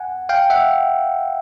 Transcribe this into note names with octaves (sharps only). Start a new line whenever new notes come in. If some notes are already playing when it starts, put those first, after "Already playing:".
Already playing: F#5 G#5
F5 G5
E5 F#5